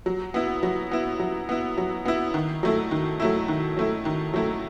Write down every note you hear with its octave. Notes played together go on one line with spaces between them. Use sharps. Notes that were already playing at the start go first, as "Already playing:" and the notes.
F#3
B3 E4
F#3
B3 E4
F#3
B3 E4
F#3
B3 E4
D#3
F#3 A3 E4
D#3
F#3 A3 E4
D#3
F#3 A3 E4
D#3
F#3 A3 E4